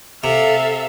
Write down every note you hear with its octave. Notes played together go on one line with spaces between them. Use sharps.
C3 A4 E5 F5